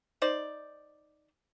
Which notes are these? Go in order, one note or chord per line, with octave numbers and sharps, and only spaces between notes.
D#4 C5 D5